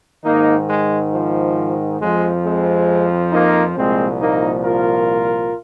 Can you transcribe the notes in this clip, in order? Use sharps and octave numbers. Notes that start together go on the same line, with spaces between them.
G#2 D#3 A#3 D#4
G#3
F3
F2 F3 G#3
G#3 C4
A#3 D#4
C2 A#2 F3 G#3 C4
A#3 D#4
F4 A#4